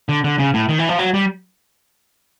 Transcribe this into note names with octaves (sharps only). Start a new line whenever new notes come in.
D3
D3
C#3
A2
D#3
E3
F3
F#3
G3